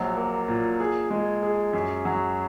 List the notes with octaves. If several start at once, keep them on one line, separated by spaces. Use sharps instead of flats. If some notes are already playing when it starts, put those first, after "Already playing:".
Already playing: A#1 F#3
A#3
A#2
G#4
G#3
G#4
F#2
F#3